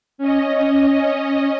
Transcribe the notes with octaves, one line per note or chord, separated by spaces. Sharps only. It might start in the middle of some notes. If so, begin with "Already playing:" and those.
C#4 D#5